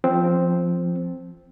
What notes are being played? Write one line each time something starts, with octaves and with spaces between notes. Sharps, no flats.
F3 C4